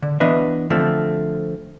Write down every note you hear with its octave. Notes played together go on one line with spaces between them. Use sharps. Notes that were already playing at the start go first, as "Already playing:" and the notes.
D3
E3 B3 D4 B4 D#5 E5
D3 F3 A3 C4